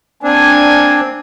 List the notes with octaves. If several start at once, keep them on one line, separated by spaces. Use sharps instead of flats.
A#3 C4 D4 G#5